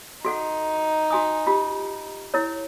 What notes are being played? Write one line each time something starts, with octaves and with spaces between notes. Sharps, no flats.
D#4 F#4 A4 F#5
F#4 G#5 D#6
F4 G4
E4 A#4 C#5